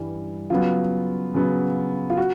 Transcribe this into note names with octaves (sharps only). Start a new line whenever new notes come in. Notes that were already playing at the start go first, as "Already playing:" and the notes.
Already playing: G2 E3 G3
C#3 F#3 B3 F4
C#3 F#3 B3
F4
F#4